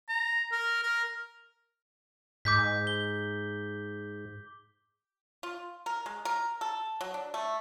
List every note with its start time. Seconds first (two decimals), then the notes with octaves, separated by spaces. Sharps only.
0.09 A#5
0.52 A#4
0.83 A#4
2.45 G#2 D6 G6 B6
2.87 G7
5.43 F4
5.86 A#4
6.06 G#3
6.25 A#4
6.61 A4
7.01 F#3
7.14 D4
7.34 A3